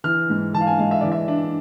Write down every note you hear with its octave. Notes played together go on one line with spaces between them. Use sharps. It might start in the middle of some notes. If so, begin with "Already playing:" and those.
E3 F6
G#2
E3 A5
F5
G#5
G#3 F5
E5
E3 D5
E5
D4